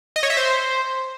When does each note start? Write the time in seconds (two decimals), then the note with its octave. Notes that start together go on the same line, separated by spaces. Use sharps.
0.16 D#5
0.23 C#5
0.30 E5
0.37 C5